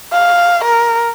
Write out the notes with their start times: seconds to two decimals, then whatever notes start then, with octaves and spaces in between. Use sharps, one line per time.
0.13 F5
0.65 A#4